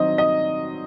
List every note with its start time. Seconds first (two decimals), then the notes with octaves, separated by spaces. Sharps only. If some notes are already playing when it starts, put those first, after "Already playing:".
Already playing: D#3 F#3 C4 D#5
0.18 D#5